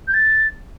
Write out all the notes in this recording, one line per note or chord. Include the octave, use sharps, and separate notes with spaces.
G6
A6